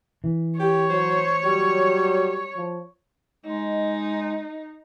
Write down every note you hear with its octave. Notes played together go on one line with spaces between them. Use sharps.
E3
G4 C#5
F#3 C5
F#3 G3
F3
G#3 D#4